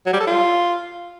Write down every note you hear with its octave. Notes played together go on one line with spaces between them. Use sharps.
F#3
G3
A4
F4